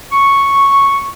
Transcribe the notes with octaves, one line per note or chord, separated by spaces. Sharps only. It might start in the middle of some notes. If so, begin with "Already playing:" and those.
C#6